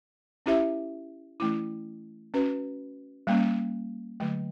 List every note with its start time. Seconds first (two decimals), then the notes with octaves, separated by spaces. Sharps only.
0.46 C#4 E4 G4 C5 E5
1.40 E3 A3 C#4 E4
2.34 C#4 F#4 B4
3.27 G3 A#3 C#4
4.20 D3 F#3 A3